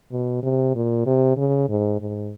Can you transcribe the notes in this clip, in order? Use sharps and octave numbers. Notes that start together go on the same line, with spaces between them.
B2
C3
A#2
C3
C#3
G#2
G#2